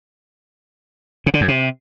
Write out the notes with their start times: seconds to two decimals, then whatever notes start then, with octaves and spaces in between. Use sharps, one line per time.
1.26 C#3
1.34 D3
1.41 F#2
1.48 C3